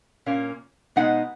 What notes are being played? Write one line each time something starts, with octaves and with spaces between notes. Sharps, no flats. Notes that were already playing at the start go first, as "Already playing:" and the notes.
A#2 A#3 C#4
B2 G#3 B3 D#4 F#5